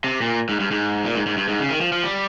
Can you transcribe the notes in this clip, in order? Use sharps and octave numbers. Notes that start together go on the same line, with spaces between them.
C3
A#2
G#2
G2
G#2
A#2
G#2
G#2
G2
G#2
C#3
D#3
F3
F3
G3